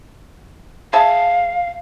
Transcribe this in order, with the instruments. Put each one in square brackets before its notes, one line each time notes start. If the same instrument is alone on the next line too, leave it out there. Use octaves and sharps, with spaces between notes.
[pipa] G#4 E5 A5 [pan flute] F5